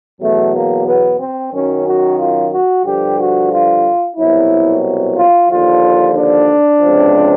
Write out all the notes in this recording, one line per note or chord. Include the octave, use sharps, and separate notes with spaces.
E2 B2 F#3 A3
A#3
B3
C4
F#2 D#3 F#3 C#4
F#4
F4
F#4
G2 D3 F3 G4
F#4
F4
C2 B2 F#3 E4
F4
D#2 D3 F3 F4
D4
C#2 C3 F3